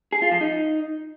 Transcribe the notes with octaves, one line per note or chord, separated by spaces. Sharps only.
G#4
F4
F3
D#4